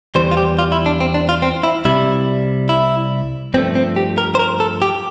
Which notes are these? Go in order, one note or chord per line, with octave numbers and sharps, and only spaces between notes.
E2 E3 G3 C5
F4
G4
F4
E4
D4
C4
D4
F4
C4
E4
C2 C3 G3 E4
E4
G2 F3 A3 C4
C4
G4
A#4
C5
A#4
A4
G4